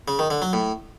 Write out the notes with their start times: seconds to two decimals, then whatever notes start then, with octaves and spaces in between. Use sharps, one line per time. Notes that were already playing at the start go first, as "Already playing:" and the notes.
0.08 C#3
0.19 D#3
0.30 D3
0.42 F#3
0.53 A2